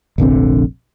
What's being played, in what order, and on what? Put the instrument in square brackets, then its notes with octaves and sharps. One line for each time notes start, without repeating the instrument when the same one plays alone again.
[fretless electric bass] F1 A#1 D3 C4